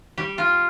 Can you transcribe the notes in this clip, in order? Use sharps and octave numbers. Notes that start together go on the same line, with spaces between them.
G3 G4
G3 F4